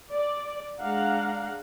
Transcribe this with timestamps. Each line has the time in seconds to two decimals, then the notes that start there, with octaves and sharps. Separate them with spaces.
0.12 D5
0.81 G#3 D4 F5 F#5 A#5